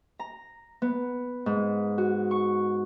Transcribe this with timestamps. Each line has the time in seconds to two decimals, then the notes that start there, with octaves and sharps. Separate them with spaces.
0.19 A#5
0.82 B3
1.46 G#2
1.98 F#4
2.31 C#6